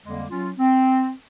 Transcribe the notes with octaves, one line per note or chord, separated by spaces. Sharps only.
F2 D3 G3 G#3 A#3
F#3 C#4 F4
C4